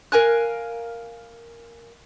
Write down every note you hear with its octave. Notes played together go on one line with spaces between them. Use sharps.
A#4 F5 G#5 F#6